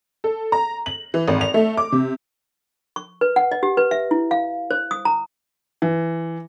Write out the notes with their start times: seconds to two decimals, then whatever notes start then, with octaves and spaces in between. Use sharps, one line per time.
0.24 A4
0.52 A#5
0.86 F#7
1.14 E3
1.28 G#1
1.41 F7
1.54 A3
1.77 D6
1.92 C3
2.96 C#6
3.21 B4
3.36 F#5
3.52 D#5
3.63 G4
3.77 B4
3.91 E5
4.11 E4
4.31 F5
4.71 C5
4.91 D#6
5.05 A#5
5.82 E3